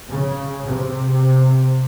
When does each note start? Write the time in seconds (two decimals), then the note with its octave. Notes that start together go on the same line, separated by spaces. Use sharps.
0.10 C#3
0.67 C3